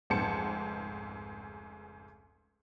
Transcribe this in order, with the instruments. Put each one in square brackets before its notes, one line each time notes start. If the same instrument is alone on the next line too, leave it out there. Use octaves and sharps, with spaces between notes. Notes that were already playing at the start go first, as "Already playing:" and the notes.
[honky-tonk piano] F1 C#2 G#2 C5 A5 C#7